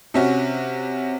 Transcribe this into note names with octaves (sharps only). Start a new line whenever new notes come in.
C3 C#4 F#4